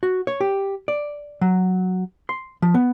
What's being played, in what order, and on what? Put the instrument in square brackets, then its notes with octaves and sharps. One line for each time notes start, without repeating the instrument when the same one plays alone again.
[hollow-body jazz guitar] F#4
C#5
G4
D5
F#3
C6
F3
B3